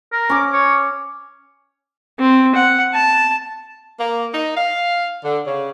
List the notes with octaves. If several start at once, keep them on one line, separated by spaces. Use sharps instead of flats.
A#4
C#4 D6
C#5
C4
F#5
A5
A#3
D#4
F5
D3
C#3